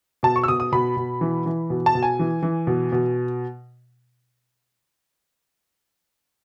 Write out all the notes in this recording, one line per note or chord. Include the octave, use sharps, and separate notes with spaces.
B2 A5
C#6
E6
B2 D#6
D#6
B2 B5
B2
E3
E3
B2
A5
B2
G#5
E3
E3
B2
B2